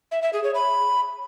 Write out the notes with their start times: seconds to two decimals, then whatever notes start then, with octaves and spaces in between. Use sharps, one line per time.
0.11 E5
0.22 E5
0.33 G#4
0.44 C#5
0.55 B5